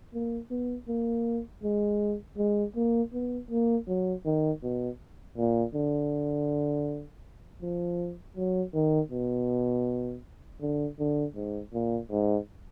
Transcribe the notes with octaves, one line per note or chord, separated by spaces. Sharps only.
A#3
B3
A#3
G#3
G#3
A#3
B3
A#3
F#3
D#3
B2
A#2
D3
F3
F#3
D#3
B2
D3
D3
G#2
A#2
G#2